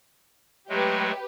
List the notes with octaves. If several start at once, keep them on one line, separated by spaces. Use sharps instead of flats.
F#3 G#3 A3 G4 B4